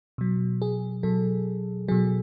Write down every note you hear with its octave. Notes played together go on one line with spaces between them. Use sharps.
B2 F#3
G#4
B2 F#3 A4
B2 F#3 G#4